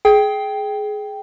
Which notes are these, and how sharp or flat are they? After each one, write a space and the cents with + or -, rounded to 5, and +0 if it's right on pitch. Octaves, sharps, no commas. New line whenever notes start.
G#4 +20 G5 +0